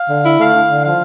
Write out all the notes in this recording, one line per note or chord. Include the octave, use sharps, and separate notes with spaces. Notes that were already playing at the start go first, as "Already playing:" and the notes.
Already playing: F5
D3
E4
A3 F5
D3
D3
F3 F5